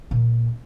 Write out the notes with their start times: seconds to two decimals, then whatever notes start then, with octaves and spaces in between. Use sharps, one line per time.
0.11 A#2